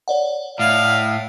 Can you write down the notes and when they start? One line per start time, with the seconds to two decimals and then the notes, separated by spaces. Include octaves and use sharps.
0.08 C#5 D5 F#5
0.59 A2 F5